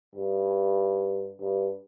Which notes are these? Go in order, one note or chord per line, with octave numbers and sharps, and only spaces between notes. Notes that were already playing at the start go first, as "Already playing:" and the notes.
G2
G2